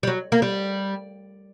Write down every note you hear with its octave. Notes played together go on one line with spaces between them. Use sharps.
G3
F#3
A#3
G3